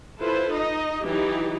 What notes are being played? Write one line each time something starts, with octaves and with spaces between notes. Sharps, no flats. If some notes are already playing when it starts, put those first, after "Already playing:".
E4 F4 A4 B4 C5
D#4 D#5
E3 F#3 D#4 E4 G4